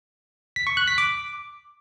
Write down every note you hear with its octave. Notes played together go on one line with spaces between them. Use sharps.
B6
C#6
F#6
B6
D6